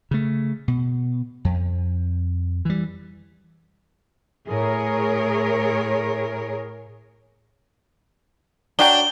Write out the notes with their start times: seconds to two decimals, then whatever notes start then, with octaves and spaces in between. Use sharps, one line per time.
0.11 C#3 A3
0.68 B2
1.45 F2
2.65 E3 G3
4.47 A2 G#4 A#4 C#5
8.79 F#3 D4 F#4 G5 G7